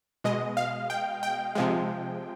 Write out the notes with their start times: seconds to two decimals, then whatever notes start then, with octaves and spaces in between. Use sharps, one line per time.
0.24 B2 G#3 D#5
0.57 F5
0.90 G5
1.23 G5
1.55 C3 F3 G#3